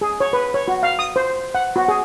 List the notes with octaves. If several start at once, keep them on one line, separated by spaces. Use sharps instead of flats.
G#4
C#5
B4
C#5
F#4
F5
D#6
C5
F#5
F#4
G#4